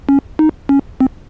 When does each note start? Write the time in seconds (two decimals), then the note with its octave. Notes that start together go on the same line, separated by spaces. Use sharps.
0.09 C#4
0.39 D#4
0.69 C#4
1.00 C4